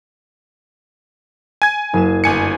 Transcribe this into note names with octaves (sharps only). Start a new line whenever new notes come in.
G#5 G#6
F#1 C7 E7
G1 G#5 C#7